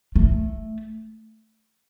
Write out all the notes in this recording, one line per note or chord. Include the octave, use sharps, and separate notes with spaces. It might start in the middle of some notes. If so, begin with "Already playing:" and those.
A3